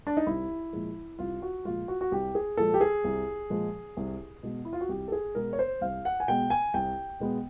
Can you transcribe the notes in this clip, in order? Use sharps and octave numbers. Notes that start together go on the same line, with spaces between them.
D4
D#4
C2 E4
A#2 F3 G#3
C2 F4
F#4
A#2 F3 G#3 F4
F#4
F#4
C2 G4
G#4
A#2 F3 G#3 A4
G4
G#4
C2
A#2 F3 G#3
C2
B2 G#3 B3
E4
F4
F#4
C2 G4
A4
G#4
B2 G#3 B3 A#4
C#5
C5
C2 F5
F#5
G#5
B2 G#3 B3 G5
G#5
C2 G5
B2 G#3 B3